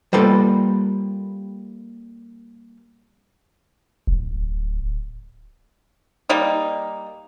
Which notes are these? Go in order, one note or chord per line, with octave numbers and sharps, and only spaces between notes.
G3 A#3 F4 A4 B4 C5
D1
G3 A#3 D#4